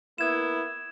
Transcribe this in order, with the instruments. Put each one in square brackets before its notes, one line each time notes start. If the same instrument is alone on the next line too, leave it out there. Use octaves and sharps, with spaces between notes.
[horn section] A#3 B3 E4 [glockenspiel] G#6 E7